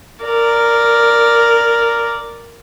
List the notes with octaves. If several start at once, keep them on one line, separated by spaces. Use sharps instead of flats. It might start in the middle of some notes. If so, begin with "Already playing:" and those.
A#4 D5